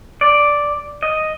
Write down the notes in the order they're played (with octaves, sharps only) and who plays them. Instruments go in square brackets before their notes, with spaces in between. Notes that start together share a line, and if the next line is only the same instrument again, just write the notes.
[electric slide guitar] D5
D#5